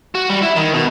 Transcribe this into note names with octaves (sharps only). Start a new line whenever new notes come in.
F#4
G3
E4
D#3
B2